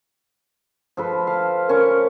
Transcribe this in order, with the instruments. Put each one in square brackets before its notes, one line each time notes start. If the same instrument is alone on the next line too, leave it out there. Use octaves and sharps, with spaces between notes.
[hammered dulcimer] F3 A4 B4
F5
[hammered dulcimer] C#4 A5 C#6 [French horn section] A#4